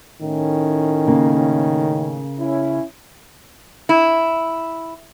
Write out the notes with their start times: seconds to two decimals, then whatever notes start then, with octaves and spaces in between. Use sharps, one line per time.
0.21 A2 D#3 C#4
1.07 C#3 A#3
2.38 C#4 E4
3.89 E4